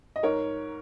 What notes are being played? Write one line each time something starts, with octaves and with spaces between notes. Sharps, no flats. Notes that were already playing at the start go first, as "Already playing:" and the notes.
D#5
G#2 A#4 C#5